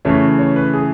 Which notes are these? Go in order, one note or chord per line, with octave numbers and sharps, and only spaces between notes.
C#3 E3 A3 C#5
C#5
B4
G#4